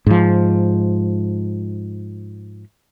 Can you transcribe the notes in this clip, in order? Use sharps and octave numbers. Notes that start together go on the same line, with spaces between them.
G#2 F3